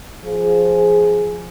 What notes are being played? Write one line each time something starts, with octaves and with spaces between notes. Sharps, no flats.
F3 G#4